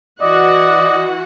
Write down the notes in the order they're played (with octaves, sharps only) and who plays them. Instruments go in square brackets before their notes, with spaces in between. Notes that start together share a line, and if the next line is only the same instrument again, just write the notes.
[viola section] E3 F#4 F#5 [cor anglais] D5 [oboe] D#5